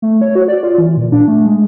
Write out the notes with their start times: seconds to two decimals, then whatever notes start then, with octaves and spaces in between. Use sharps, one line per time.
0.02 A3
0.21 C#5
0.35 F#4
0.48 D5
0.63 F4
0.78 E3
0.97 A#2
1.12 D4
1.28 A3
1.45 G#3